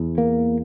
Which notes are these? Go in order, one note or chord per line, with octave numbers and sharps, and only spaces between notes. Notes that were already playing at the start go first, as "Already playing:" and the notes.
Already playing: E2
A#3